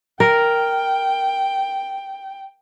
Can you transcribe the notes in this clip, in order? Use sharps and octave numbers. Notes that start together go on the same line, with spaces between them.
A#4 G5